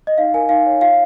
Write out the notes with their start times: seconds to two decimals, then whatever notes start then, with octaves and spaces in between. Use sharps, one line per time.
0.07 D#5
0.18 D#4 F5
0.34 A#4 G#5
0.49 D#4 F5
0.66 C#5
0.81 F4 F5